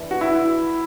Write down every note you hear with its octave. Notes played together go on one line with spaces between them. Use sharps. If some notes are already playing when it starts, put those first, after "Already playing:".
Already playing: E3 D4
F#4
E4